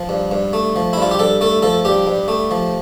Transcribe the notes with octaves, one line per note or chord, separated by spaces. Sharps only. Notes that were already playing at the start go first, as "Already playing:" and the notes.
Already playing: F3
G2
G2
A3
F3
E4
G2 F4
G4
G2 A4
A3 A4
F3 A4
G2 G4
G2
A3
F3